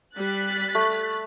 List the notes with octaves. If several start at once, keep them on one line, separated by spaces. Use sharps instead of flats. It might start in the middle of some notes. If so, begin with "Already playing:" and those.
G3 F#6 A6 B6
A3